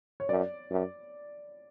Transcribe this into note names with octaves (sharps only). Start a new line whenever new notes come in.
C#5
F#2 D5
F#2